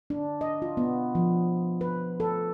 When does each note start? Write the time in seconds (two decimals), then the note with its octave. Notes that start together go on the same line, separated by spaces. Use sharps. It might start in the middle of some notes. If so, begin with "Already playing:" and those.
0.10 D4
0.41 D#5
0.62 F4
0.77 B3
1.15 F3
1.81 B4
2.20 A4